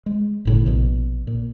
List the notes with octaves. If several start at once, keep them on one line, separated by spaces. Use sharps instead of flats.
G#3
G1 A2 C#3
A#1 B2
A#2